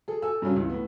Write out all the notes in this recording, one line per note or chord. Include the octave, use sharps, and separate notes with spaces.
G#4 A4
A4 G#5 E6
G2 C#3 F#3 C#4
C#2 E3
A2 B3